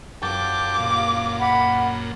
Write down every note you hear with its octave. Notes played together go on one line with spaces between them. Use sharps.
F#2 F4 G5 A5 D6
F#2 A#2
F#5 B5